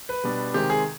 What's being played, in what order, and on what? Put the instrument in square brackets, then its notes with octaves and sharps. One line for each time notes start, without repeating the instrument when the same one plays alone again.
[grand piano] B4
B2 G3 D4
C3 D#3 G#3 C4 G4
G#4